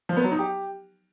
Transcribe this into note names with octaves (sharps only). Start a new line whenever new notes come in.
F3
B3
F#3
D#4
G4